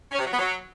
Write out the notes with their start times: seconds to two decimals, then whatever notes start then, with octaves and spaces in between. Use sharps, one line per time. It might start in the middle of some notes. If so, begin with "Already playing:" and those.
0.12 C#4
0.18 C3
0.25 F#3
0.32 B3
0.39 F#3